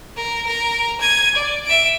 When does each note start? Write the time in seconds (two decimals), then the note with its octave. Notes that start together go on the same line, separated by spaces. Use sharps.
0.17 A#4
0.47 A#4
1.01 G#6 D#7
1.35 D5
1.66 E5 D7